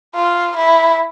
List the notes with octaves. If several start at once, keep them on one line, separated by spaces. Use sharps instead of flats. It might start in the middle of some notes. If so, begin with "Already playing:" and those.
F4
E4